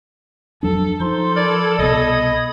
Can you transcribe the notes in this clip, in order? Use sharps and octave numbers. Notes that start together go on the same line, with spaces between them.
F2 F#3 D4 A4
F3 D#4 A4 C5 C6
A#4 D5 B5 G#6
C2 B2 D#5 B5 D#6 G#6